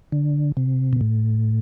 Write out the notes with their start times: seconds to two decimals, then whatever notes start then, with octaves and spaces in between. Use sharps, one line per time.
0.12 D3
0.57 C3
0.93 B2
1.01 A2